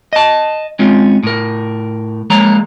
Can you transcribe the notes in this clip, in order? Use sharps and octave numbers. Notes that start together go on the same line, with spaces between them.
D#5 A5
G#3 C4 C#4 F4
A2 A#4
F3 G#3 A#3 C#5 A#5